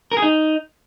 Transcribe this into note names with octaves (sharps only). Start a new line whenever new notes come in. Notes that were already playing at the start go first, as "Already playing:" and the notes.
A#4
G#4
D#4